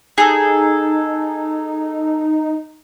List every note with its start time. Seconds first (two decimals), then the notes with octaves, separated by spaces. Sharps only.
0.18 D#4 G#4 A4